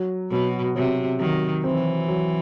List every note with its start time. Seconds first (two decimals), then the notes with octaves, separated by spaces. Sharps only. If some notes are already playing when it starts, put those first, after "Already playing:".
Already playing: F#3
0.31 B2 F#3
0.75 C3 F#3
1.20 D#3 F#3
1.64 E3 C4
2.08 F#3